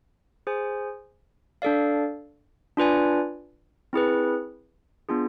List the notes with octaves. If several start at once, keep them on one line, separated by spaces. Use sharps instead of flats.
G#4 C5 G#5
D4 A4 D5 F5
D4 F4 B4 D5 G#5
C4 E4 G#4 B4
B3 D4 F4 G#4